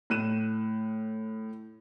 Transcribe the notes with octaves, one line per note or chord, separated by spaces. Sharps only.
A2 F#6 D#7 E7